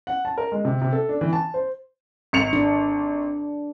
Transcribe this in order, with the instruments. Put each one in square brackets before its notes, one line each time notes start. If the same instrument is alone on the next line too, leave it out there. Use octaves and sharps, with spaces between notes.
[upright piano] F#5
A5
A#4
G#3
C3
C3
A4
D4
E3
A5
C5
G#1 C#7 F7
[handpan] D4